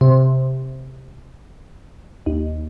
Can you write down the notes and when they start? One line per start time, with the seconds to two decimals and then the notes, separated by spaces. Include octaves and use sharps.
0.01 C3
2.26 D#2